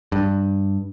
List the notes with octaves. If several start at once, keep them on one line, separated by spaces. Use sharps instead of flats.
G2